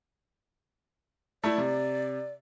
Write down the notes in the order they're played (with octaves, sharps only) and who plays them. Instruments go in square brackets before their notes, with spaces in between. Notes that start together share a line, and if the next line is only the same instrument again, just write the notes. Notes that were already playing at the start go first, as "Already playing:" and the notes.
[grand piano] A3 E4 [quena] D5
[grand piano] C3